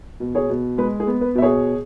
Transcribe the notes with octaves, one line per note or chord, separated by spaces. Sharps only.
B2
G#4 C#5
B2
G#3 B4
G#4
B3
B4
B2 E5
G#4 C#5